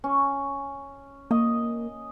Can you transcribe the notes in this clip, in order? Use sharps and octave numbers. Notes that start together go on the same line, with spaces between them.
C#4
A#3 D#5